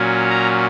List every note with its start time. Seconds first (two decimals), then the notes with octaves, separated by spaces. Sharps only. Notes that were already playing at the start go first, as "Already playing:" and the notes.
Already playing: A#2 F#3 C#4
0.29 A#5